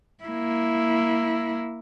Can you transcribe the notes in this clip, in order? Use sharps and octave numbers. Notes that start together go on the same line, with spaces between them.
A#3 E4